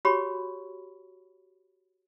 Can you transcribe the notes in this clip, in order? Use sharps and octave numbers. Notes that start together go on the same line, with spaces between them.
F#4 G4 C#5 B5 C#6